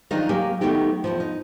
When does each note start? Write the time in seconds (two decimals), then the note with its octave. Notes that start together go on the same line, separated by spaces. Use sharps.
0.11 D#3 F3 F#3 D4 D#4 A#4
0.29 F#3 A#3 G4 G#5
0.61 D#3 F#3 A3 B3 D#4 G4
1.04 E2 G2 F3
1.20 D#4